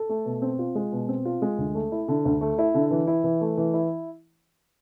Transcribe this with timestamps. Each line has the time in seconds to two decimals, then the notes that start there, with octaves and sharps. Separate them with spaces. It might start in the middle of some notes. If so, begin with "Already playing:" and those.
Already playing: A4
0.09 A3
0.25 B2
0.42 C4
0.59 F4
0.75 G#3
0.92 B2
1.08 C4
1.25 F4
1.42 G#3
1.58 D2
1.75 A3
1.92 E4
2.08 D3
2.25 D2
2.41 A3
2.58 E4
2.74 D3
2.91 E3
3.07 E4
3.24 E3
3.41 A3
3.57 E3
3.74 E4